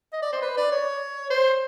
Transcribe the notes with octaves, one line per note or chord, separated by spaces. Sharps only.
D#5
D5
C5
B4
D5
C#5
C5